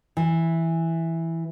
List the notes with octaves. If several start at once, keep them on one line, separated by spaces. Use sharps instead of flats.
E3